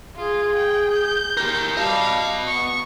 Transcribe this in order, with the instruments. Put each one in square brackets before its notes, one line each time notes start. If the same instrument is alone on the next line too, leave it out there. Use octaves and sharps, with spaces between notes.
[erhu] F4 [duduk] G#4
[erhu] G5
G6
[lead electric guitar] G4 A#4
[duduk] G3 [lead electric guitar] D#5 A5 [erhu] F5
[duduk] B3 [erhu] C#6